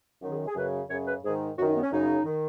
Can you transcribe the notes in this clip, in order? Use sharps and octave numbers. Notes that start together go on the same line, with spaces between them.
F#2 D#3
G#4
G#4
F#2 C#3 B4
F#2 C#3 C#5
B4
G#2 D#3 G#4
F#2 D#3 F#4
D#4
B3
C#4
F#2 C#3 D#4
D#3